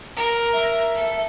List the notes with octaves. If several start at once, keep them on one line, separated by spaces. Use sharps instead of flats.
A#4
E5
A4